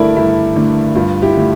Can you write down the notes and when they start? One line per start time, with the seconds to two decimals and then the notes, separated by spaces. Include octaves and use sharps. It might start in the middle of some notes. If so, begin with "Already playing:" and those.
Already playing: G2 D3 A3 E4 A4 A#4 D5
0.16 G2 E4
0.56 D3 A3
0.96 G2 F4
1.22 E4 G4
1.35 D3 A3